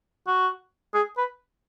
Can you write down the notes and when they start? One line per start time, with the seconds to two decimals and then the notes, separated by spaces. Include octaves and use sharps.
0.27 F#4
0.94 G#4
1.17 B4